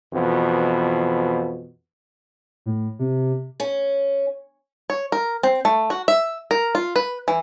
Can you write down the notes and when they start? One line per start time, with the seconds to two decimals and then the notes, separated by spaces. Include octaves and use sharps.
0.12 F2 B2 E3
2.66 A2
2.99 C3
3.60 C#4
4.90 C#5
5.12 A#4
5.43 C4
5.65 A3
5.90 F#4
6.08 E5
6.51 A#4
6.75 F4
6.96 B4
7.28 E3